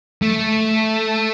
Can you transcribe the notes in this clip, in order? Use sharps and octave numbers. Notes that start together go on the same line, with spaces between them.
A3